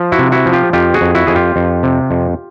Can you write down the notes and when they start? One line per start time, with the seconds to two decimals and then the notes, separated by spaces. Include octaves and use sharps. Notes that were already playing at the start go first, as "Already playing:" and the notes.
Already playing: F3
0.12 E4 F#4
0.19 C3
0.32 E4 F#4
0.46 F3
0.53 F4 G4
0.73 F2 F4 G4
0.94 F#4 G#4
1.01 F2
1.15 E4 F#4
1.27 F2 G#4
1.35 F4 G4
1.56 F2
1.83 C3
2.11 F2